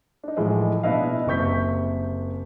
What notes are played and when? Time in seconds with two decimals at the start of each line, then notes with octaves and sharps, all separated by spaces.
0.23 D4 D#4
0.37 A2 E3 F3 G#3
0.83 B2 D4 E4 B4 D#5 F5
1.26 F#1 C3 A#3 C#6 G6 B6